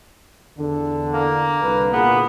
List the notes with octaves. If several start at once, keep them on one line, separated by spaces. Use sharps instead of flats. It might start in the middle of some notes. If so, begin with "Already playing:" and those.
E2 D3
A#3
C2 D3 B4
A#2 A#3 B3 G#4